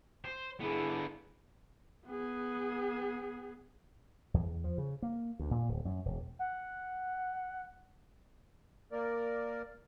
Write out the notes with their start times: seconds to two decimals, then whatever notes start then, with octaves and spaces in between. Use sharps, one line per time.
0.25 C5
0.60 D3 B3 E4 G#4
2.07 B3 G#4
4.34 E2
4.64 F3
4.78 C#3
5.02 A#3
5.39 D2
5.51 A#2
5.69 D1
5.85 F#2
6.05 E1
6.39 F#5
8.92 A#3 A#4 D5